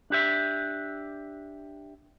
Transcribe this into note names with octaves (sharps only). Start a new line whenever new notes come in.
D4 G4 E5